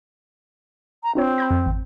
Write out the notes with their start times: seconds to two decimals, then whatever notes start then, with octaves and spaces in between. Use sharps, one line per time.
1.03 A#5
1.15 C4 D4 F4 C#5
1.38 B5 G6 A#6
1.50 F2
1.66 G#1